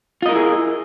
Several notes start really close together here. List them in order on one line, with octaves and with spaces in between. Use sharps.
F4 D#5 A#4 E4 G#4